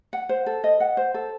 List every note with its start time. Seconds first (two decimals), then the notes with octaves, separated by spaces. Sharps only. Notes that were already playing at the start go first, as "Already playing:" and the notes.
0.13 F#5
0.29 C5
0.46 A4
0.64 D#5
0.80 F#5
0.97 C5
1.14 A4